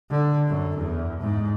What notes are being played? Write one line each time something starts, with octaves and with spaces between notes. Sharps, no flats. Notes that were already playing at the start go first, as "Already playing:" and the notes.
D3
F#2
E2
G#2